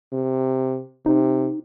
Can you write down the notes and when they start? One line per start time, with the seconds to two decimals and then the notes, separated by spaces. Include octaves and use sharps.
0.12 C3
1.06 C3 D#4